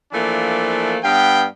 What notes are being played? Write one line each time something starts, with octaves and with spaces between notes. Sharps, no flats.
E3 F3 A3 A#3 D4
G2 B3 F5 G5